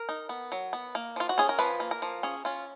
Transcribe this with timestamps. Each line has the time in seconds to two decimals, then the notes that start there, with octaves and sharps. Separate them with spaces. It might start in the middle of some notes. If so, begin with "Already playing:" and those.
Already playing: A#4
0.09 D#4
0.29 B3
0.52 F#3
0.73 B3
0.95 A#3
1.16 F3 F4
1.29 F#4
1.38 C#4 G#4
1.49 A#4
1.59 F3 B4
1.80 A#3
1.91 A#4
2.02 F3
2.23 C#4 G#4
2.45 C#4 F4